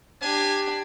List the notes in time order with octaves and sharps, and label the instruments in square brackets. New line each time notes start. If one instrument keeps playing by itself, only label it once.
[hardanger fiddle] D4 G4 [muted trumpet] G#5